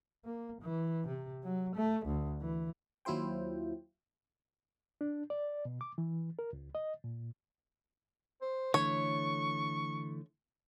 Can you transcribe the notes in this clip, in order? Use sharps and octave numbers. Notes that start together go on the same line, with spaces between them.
A#3
E3
C3
F#3
A3
D2
E3
D#2 F#3 E4 F4 C5 G5
D4
D5
B2
D6
E3
A#4
C#2
D#5
A#2
C5
D3 E3 A3 C#5 C#6